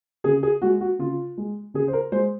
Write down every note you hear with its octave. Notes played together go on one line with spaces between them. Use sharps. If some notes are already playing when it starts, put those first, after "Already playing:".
C#3 G#4
G#4
G#3 F#4
F#4
C#3 F4
G#3
C#3 G#4
C5
A#4
G#3 C5